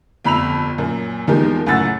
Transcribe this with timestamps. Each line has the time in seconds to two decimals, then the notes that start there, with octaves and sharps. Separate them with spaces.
0.25 G1 F2 B5 E6 F7
0.78 F#2 A#2
1.27 E2 F3 G#3 A#3 D#4 G4
1.66 C#2 F#2 A2 F#5 E6 A6